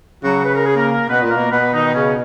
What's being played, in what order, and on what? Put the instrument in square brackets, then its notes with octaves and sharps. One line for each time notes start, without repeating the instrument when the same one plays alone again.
[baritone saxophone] C#3 [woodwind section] F#3 F#4
[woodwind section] B4
A#4
G#4
A#3 A#4
[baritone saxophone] B2 [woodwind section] B3 B4
[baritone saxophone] A#2 [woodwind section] B4
[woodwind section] A#3 A#4
[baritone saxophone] B2
[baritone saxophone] B2 [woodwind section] B3 B4
[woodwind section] D#3 D#4
C#3 C#4